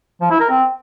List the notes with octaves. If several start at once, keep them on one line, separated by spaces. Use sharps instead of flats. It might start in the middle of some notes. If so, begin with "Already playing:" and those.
F3
E4
A#4
C4